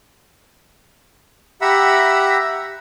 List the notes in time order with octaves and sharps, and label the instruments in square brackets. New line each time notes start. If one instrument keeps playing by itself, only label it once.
[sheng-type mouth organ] G4 E5 F#5 A#5 B5 E6